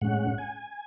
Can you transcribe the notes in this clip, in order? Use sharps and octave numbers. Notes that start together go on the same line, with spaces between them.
A2 G#3 C#4 F#5
G#5